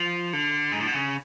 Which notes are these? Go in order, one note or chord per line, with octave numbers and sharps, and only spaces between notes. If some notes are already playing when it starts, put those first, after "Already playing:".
Already playing: F3
D3
G#2
A2
B2
C#3